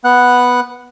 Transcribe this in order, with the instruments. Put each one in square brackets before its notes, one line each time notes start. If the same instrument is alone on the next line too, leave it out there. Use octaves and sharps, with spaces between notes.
[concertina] B3 F#5 F#6